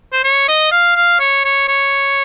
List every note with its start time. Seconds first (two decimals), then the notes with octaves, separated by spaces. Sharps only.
0.13 C5
0.24 C#5
0.48 D#5
0.72 F5
0.96 F5
1.20 C#5
1.45 C#5
1.68 C#5